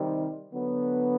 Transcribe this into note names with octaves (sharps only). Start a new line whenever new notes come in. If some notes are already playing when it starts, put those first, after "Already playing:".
Already playing: C3 D#3 G3 C4
D3 F#3 B3